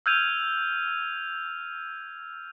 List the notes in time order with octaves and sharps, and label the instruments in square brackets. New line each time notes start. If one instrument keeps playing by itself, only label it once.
[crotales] E6 F6 G6 G#6 D#7 F7